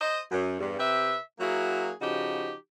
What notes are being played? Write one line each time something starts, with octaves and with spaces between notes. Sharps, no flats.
C5 D#5
F#2
E2 G2
C3 G4 B4 E5
F#3 A#3 E4 F#4 G#4
C#3 F3 D#4 F#4 G4